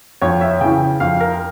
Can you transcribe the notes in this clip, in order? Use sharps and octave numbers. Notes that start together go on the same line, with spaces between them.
F2 C#5
E5
C#3 E3 G5
F2 F5
A#4